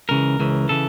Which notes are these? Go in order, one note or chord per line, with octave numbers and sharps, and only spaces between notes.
C#2 C#3 E3 A#4
C#2 C#3 E3
C#3 E3 A4